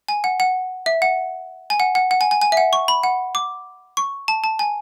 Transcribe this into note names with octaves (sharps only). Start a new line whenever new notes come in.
G#5
F#5
F#5
E5
F#5
G#5
F#5
F#5
F#5
G#5
G#5
G#5
E5
F#5
C#6
B5
F#5
D6
C#6
A5
A5
G#5